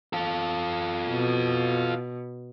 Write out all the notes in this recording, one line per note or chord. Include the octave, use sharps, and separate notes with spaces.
F4 A4
B2